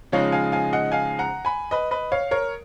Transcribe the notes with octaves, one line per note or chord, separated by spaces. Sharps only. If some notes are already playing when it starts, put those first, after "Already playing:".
C#3 F3 G#3 D#4 C#5 F5
F5 G#5
F5 G#5
D#5 F#5
F5 G#5
F#5 A#5
G#5 B5
B4 D#5
B4 D#5
C#5 F5
A#4 C#5